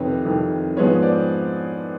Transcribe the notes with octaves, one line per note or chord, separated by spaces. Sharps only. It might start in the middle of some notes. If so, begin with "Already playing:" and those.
Already playing: F2 C3 D#3 B4 C#5
F2 C3 D#3
G#2 F3 G#3 B3 B4 C#5
C5 D5